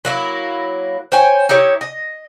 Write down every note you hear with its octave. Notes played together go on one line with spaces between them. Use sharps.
F#3 A#3 E4
C5 C#5 G5 G#5
D#4 E4 G4 C#5
D#5